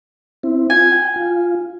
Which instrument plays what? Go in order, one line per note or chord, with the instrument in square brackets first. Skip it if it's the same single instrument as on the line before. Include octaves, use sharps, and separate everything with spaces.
[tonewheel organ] C4 E4
[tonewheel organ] F4 [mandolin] G#5
[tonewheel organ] G5
F4